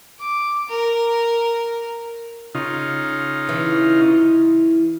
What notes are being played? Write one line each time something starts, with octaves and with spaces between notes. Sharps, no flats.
D6
A#4
C#3 D#4 F4
E3